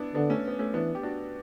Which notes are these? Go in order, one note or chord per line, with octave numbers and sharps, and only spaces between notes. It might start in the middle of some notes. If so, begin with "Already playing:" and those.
Already playing: B3 D4 E4
D3 B3 D4
A3 C#4
B3
A3 C#4
E3 B3 D4
G4
D4 F#4